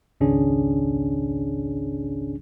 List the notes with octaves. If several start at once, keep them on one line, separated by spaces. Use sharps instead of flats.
G#1 C#2 C#3 C#4 D4 G#4